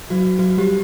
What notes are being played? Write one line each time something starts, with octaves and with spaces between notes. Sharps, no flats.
F#3 F#4
F#3 F#4
G3 G4